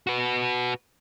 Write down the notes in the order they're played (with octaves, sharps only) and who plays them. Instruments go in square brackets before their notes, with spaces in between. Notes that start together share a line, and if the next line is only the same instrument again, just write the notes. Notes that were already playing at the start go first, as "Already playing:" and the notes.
[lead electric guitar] F#4 B4